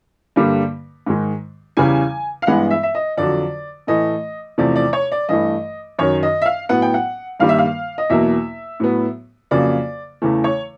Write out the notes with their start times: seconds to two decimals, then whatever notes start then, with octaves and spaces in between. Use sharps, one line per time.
0.36 G2 D3 G3 A#3
1.06 G#2 D#3 G#3
1.77 E2 C#3 E3 G3 G#5
2.42 F5
2.47 G2 E3 G#3 B3 F#5
2.71 E5
2.83 E5
2.95 D#5
3.17 F2 D3 F#3 D5
3.87 A2 E3 A3 D#5
4.58 E2 C3 F3 A3 D5
4.76 D5
4.93 C#5
5.12 D5
5.29 G2 E3 A3 D#5
5.99 F#2 D#3 F#3 C#5
6.23 D#5
6.42 E5
6.46 F5
6.69 A2 F#3 B3 F#5
6.82 G5
6.94 F#5
7.40 G2 D#3 G3 A#3 F5
7.49 E5
7.58 F5
7.98 D#5
8.10 E2 B2 F#3 A#3 E5
8.80 A2 F#3 B3
9.51 F2 C#3 F#3 A#3 D5
10.22 E2 C#3 E3 A3
10.44 C#5